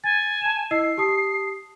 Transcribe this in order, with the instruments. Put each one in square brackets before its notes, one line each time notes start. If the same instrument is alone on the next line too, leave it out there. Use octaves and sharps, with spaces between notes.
[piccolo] G#5 [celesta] A6
[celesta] A5 E7
[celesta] E4 D#5 E6 [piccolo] C7
[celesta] G4 A5 D#6